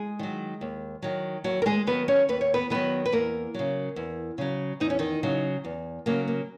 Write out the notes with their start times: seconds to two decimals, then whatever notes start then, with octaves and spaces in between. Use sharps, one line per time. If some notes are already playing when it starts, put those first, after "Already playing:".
Already playing: G#3 G#4
0.19 D#3 F#3
0.61 D#2
1.02 D#3 F#3
1.44 D#2 F#3 F#4
1.62 A#4
1.66 G#3 G#4
1.87 D#3 F#3 B3 B4
2.08 C#4 C#5
2.29 D#2 B4
2.41 C#5
2.54 B3 B4
2.70 D#3 F#3 B3 B4
3.06 B4
3.12 E2 A#3 A#4
3.54 C#3 F#3
3.96 E2
4.38 C#3 F#3
4.80 E2 D#4
4.90 C#4
4.99 D#3 D#4
5.23 C#3 F#3
5.65 E2
6.06 C#3 F#3 A#3
6.28 A#3